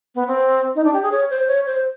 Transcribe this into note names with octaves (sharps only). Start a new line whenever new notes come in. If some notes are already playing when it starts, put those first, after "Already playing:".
B3
C4
D#4
D4
G4
G#4
C#5
C5
C#5
C5